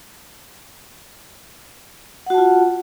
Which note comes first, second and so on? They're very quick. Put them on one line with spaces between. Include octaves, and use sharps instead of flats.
F#5 F#4 A5 F4